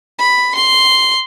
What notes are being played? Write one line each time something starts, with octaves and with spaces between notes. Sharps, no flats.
B5
C6